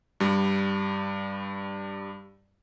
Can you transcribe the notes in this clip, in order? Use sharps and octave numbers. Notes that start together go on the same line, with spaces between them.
G2 G3